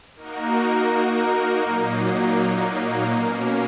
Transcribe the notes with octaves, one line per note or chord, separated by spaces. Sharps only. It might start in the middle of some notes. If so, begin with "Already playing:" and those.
A#3 D#4 F#4 A#4
A#2 F#3 A#3 D#4
B2 A#3 C#4